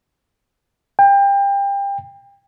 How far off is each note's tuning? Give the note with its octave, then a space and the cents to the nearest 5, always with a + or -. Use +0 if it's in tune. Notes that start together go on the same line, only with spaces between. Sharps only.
G5 +30